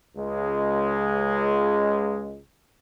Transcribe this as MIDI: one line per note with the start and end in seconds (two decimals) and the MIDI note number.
0.17 2.40 37
0.17 2.40 56